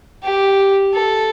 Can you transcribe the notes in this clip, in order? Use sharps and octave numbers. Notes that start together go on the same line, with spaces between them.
G4
A4